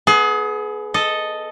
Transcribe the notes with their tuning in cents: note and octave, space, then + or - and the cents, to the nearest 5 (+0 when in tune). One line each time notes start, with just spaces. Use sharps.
B3 +5 G#4 +30
A4 +0 D#5 +0